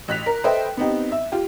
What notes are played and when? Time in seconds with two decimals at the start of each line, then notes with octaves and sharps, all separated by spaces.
0.08 A1 F#6 B6 F7
0.26 A#4
0.44 A4 B4 C5 D#5 E5 G5
0.77 B3 C4 D#4 G4
1.12 E5
1.32 F4 G4